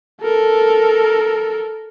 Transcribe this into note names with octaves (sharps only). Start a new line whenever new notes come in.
A4 A#4